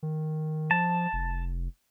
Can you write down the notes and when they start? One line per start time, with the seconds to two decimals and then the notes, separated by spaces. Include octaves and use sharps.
0.03 D#3
0.71 F3 A5
1.13 F1